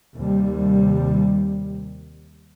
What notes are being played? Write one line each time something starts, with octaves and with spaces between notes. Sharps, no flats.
D#2 C3 G3